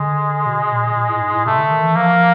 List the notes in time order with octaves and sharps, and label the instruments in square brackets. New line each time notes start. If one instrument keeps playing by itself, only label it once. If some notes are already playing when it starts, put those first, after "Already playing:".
Already playing: [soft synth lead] D3 [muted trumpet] G#3
[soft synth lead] B2
A#2
A#2
A2
G#2
A2
[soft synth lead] C3 [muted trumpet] A3
[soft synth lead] D3
D#3
E3
[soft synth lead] F3 [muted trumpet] A#3